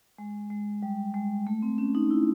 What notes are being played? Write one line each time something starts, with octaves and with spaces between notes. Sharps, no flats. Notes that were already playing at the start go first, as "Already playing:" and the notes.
G#3
G#3
G3
G#3
A3
C4
C#4
D#4
E4